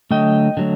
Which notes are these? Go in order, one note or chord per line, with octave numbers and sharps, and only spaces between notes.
D3 F#3 A3 D#5 G5
D3 F#3 A3